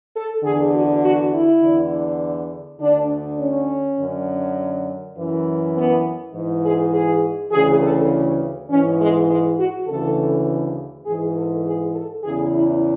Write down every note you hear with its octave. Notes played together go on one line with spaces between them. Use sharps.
A4
E2 D3 G#4
F#4
F#4
E4
E2 D3
D2 D3 D4
C#4
F#2 D3
F#2 E3
B3
G#2 E3
G#4
G#4
D2 C#3 E3 G#4
A4
G#2 E3 C#4
G#3
G#3
F#4
D2 C#3 E3 A4
G#2 E3 G#4
A4
G#4
A4
E2 C#3 E3 G#4
E4